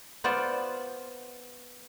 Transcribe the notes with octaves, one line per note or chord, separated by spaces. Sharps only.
B3 F4 C5 D5 F#5